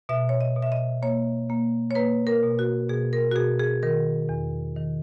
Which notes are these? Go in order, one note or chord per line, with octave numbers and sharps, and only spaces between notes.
B2 E5
C#5
D#5
B2
E5
D#5
A#3 C#5
A#3
C#5
A#3 B4
A#4
B2
F#4
B2 G#4
A#4
F#4
B2 G#4
G#4
D#3 A#4
E2
D#3